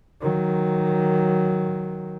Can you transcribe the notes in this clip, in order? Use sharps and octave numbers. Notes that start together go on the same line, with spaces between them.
D#3 F#3